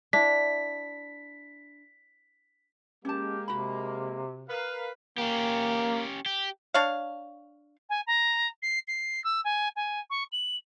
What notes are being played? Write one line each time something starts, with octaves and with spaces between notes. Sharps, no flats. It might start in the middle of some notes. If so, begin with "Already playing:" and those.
D4 E4 B6
G#3 A#3 C#4 G4 A5
C3 F#4 B5
A#4 B4 F5
A#3 C#4 G4
G4
D4 C#5 F5
G#5
A#5
C7
C7
E6
G#5
G#5
C#6
F#7